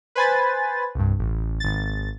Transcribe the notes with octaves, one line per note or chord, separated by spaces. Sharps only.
B4 C5 G#5 B5 A6
C2 G2
A1
G#1 A6